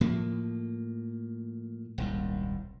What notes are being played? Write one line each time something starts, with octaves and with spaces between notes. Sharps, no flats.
A2 F3 A#3
D#1 C2 G#2